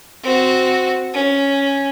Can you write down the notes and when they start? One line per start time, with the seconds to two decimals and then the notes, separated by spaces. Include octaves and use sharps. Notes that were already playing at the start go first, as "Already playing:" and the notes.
0.24 C4 F#4
1.14 C#4